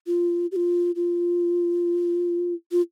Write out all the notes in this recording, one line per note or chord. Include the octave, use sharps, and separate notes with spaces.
F4
G4
F4
F4
F4